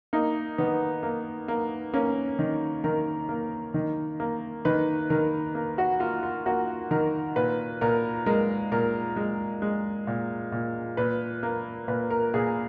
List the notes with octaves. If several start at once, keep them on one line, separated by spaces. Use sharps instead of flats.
A#3 D#4
D#3 B3
A#3
A#3
A#3 C#4
D#3
D#3 A#4
A#3
D#3
A#3
D#3 B4
D#3 A#4
A#3
F#4
A#3 F4
F4
A#3 F#4
D#3 A#4
A#2 B4
A#2 A#4
G#3 A#4
A#2 A#4
G#3
G#3
A#2
A#2
A#2 B4
A#3
A#2 B4
A#4
A#2 G#4